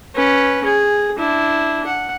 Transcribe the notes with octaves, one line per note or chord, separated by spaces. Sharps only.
C#4 B4
G#4
D4 E4
F#5